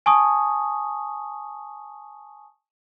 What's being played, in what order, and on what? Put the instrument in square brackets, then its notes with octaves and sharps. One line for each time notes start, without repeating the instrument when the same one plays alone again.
[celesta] G#5 A5 C#6 D#6